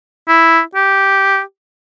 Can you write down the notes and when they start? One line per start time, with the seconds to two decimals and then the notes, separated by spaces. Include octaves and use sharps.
0.28 E4
0.75 G4